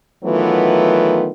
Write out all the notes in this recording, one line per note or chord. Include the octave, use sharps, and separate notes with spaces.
D#3 E3 F#3 A3 B3 F4